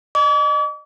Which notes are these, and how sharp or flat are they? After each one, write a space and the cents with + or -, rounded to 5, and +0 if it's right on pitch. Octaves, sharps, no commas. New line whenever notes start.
D#5 -30 D6 -40